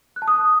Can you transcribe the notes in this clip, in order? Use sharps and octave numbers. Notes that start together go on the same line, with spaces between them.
F#6
A5
D#6